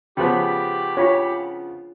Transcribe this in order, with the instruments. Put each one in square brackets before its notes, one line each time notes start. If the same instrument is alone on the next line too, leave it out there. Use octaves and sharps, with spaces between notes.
[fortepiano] C#3 F3 B3 [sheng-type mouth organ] G4 B5 [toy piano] C5 G5
[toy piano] D4 F4 F5 [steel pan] C#5